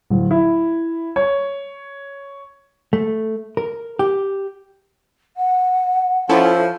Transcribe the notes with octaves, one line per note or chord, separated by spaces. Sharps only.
D1
E4
C#5
A3
A#4
G4
F#5
F3 C#4 E4 A4